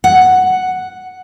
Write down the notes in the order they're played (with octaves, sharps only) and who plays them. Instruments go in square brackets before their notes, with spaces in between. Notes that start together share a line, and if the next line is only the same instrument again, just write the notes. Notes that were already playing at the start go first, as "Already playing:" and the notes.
[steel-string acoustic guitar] F#5